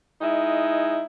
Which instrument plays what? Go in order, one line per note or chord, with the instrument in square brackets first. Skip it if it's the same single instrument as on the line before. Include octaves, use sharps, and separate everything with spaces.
[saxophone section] G#3 D#4 E4